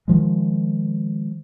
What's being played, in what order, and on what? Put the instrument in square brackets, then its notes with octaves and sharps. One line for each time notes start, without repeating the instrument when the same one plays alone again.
[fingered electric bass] D#3 F3 G#3